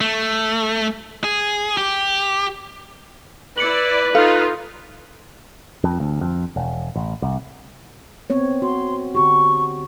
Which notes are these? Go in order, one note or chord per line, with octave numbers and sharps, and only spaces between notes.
A3
G#4
G4
E4 B4 D5 C#7 F#7
D#4 F4 A4 F5
F2
D2
F2
E1
A1
C2
B3 C4 C#5
F#4 C6
D3 F#4 G4 C#6